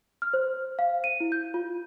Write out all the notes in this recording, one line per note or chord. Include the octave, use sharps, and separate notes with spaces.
F6
C5
F5
D#7
E4
G6
F4